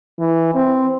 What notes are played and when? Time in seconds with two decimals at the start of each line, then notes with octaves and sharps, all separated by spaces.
0.19 E3
0.55 C4